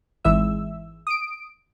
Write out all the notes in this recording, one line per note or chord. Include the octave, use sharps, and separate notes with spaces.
G#1 E3 G#3 E5 E6
D#6 D7